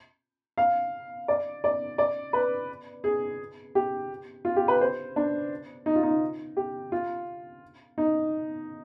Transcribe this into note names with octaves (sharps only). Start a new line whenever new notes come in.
F5
D5
D5
D5
B4
G#4
G4
F4
G4
B4
C5
D4
D#4
F4
D#4
G4
F4
D#4